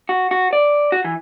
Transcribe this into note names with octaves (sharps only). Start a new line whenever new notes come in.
F#4
F#4
D5
F#4
E3